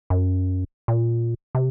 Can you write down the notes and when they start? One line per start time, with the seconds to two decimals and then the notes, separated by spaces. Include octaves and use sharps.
0.10 F#2
0.88 A#2
1.55 C3